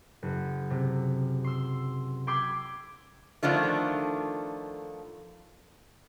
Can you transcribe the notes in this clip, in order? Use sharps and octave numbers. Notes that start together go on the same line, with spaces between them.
F#1
C3
C6 E6
G5 B5 C6 D6 E6 G#6
D3 D#3 F3 A3